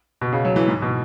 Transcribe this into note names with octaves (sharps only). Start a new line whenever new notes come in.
B2
C#3
F#3
E3
G#2
B2